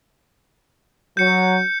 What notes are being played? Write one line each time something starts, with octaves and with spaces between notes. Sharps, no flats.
F#3 G6 C#7